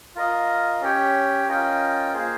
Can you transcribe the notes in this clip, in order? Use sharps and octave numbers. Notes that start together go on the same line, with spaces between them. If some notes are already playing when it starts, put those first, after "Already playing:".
F4 A#4 D#5
C#4 G4 C#5 G5
C#4 F4 A#4 D#5 G5
A#3 F4 G#4 C5